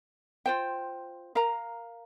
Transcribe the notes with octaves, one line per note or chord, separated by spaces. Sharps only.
F4 C5 G5
A#4 F5 A#5